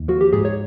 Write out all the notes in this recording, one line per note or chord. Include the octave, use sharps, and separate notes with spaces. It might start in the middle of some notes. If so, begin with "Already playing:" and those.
Already playing: D#2
F3 F#4
G4
G#2 G#4
C#5